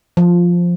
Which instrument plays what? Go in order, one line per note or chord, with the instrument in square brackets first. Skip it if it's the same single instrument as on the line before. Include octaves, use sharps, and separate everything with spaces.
[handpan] F3